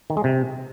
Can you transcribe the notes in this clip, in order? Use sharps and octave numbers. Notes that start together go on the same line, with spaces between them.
D#3
G#3
C3